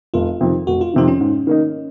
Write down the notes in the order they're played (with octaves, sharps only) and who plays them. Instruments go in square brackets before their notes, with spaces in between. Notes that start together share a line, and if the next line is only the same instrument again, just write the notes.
[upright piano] F1 [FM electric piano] F4
[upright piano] F2 C3 D#3
[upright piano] F1 [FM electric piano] F#4
[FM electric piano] F4
[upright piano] F2 C3 D#3 [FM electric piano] D#4
[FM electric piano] C#4
[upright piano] G#2
D#3 A#3 D#4